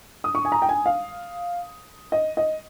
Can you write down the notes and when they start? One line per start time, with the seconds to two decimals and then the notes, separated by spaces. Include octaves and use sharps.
0.24 D#6
0.35 C#6
0.45 G#5
0.52 A#5
0.62 G5
0.69 G#5
0.86 F5
2.12 D#5
2.37 D#5